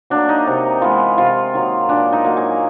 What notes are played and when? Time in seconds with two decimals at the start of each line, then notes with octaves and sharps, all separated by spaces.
0.10 F#3 A#3 D4
0.29 D#4
0.47 C3
0.82 E3 G#3 B3 F4
1.18 C3 F4
1.54 D#3 F#3 A#3
1.89 A#2 D4
2.13 D#4
2.25 F#3 A#3
2.37 G#4